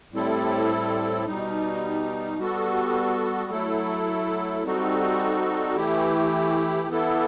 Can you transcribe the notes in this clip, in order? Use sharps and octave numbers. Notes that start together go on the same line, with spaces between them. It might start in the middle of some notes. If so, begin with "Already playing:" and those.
A2 G3 C4 E4 A4
B2 G3 D#4
G3 B3 F#4 A4
F#3 A3 E4 A4
G3 C4 D#4 F#4 A4
E3 A3 E4 G4
E3 B3 E4 A4